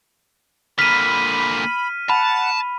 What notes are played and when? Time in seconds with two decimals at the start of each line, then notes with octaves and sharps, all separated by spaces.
0.79 A#2 D3 B5 F6 B6 D#7
2.09 F#5 A5 B5